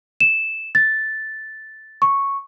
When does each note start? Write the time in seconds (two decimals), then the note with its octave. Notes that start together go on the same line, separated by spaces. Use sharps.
0.20 E7
0.75 A6
2.02 C#6